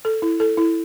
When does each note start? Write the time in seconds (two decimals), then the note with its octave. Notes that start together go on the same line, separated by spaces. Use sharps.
0.05 A4
0.22 E4
0.40 A4
0.58 E4